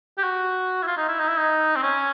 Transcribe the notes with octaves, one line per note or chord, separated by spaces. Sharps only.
G4
F#4
E4
F4
D#4
E4
D#4
E4
D#4
C4
C#4